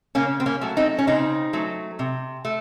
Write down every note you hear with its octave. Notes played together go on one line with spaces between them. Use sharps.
C#3 A#3 C#4
C4
A#3 C#4
F#3 A3
C4 D#4
C#4
C#3 C4 D#4
F#3 A3
C3
A3